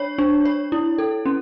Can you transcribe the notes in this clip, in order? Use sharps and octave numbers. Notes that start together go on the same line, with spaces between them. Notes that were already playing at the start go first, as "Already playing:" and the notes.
Already playing: D4 C#5
D4
C#5
E4
A4
C#4